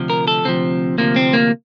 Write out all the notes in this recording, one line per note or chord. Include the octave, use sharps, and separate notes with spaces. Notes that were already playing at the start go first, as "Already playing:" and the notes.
Already playing: D2 C3 F3
A#4
A4
D2 C3 F3 C4
D2 C3 F3 A#3
C4
A#3